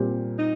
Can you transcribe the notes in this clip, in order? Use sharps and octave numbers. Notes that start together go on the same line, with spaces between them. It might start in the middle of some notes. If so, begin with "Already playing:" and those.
Already playing: A#2 G3 C4 G4
D#4